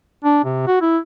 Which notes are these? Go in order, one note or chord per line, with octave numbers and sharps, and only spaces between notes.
D4
C3
F#4
E4